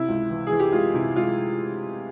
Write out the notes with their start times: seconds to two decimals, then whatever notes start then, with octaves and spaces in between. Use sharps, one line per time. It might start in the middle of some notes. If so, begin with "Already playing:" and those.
Already playing: C3 E4
0.08 C#2
0.30 E3
0.47 E3 G#4
0.60 G4
0.73 G#3 F4
0.94 C3 E4
1.16 G#3 F4